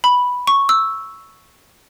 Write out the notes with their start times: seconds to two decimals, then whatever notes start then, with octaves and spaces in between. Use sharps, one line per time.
0.04 B5
0.47 C#6
0.69 E6